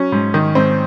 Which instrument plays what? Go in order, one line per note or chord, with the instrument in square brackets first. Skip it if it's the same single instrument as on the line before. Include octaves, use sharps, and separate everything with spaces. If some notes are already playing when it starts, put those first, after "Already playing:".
Already playing: [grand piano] F#3 C#4
G#2
D#3
G#2 C4